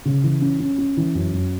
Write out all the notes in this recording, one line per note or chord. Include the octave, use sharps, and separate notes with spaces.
C#3
E3
C#4
C#4
C#4
E3
F#2
F#2